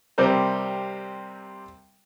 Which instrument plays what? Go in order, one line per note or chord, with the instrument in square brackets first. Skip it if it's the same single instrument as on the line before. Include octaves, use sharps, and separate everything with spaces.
[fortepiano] C3 G3 C4 A#4 C5